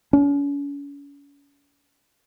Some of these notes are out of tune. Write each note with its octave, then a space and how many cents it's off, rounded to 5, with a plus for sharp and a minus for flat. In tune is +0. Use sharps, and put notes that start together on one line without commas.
C#4 +40